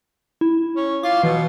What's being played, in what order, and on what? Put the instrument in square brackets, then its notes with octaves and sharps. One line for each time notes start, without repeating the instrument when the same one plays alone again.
[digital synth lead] E4
[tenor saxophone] C#4
[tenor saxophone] F4 [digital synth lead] D6
[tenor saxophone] B2 [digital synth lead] E3